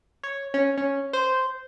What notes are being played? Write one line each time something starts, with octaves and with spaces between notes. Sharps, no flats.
C#5
C#4
C#4
C5